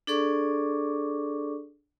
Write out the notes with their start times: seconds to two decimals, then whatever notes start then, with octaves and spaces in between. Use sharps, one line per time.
0.07 D4 G#4 A4 D5 C#6 D6